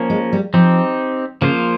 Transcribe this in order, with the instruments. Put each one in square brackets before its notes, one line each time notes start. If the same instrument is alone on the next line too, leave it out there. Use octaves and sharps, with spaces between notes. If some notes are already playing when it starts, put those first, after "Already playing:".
Already playing: [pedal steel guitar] F3 A#3 C#4
[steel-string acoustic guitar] G#3
G3
[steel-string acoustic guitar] F3 [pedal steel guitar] C4 D#4 G4
[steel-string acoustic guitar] C#3 [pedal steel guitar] F3 A#3 F4 C5